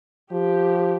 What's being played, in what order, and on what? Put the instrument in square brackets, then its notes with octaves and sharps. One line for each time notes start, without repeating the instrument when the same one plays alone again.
[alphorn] F3 [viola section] G4